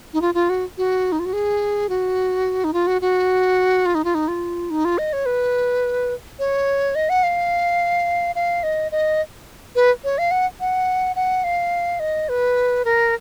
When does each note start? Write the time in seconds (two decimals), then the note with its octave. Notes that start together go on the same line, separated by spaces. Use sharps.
0.13 D#4
0.22 F4
0.34 F4
0.49 F#4
0.78 F#4
1.12 D#4
1.19 F4
1.25 F#4
1.33 G#4
1.89 F#4
2.64 D#4
2.73 F4
2.87 F#4
3.02 F#4
3.86 F4
3.95 D#4
4.04 F4
4.15 D#4
4.28 F4
4.70 D#4
4.85 F4
4.98 D#5
5.13 C#5
5.26 B4
6.39 C#5
6.95 D#5
7.09 F#5
7.23 F5
8.35 F5
8.63 D#5
8.92 D#5
9.76 B4
10.04 C#5
10.18 F5
10.31 F#5
10.60 F#5
11.16 F#5
11.44 F5
12.00 D#5
12.29 B4
12.85 A#4